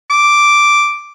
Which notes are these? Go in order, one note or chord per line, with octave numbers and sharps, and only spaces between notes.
D6